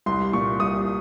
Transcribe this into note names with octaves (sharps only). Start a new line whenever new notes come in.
C2 C6
A#2 C#6
C2 D#6